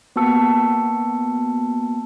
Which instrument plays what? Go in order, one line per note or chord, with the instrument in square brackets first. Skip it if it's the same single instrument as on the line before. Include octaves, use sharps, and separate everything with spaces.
[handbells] A#3 B3 F#4 A5 E6 C#7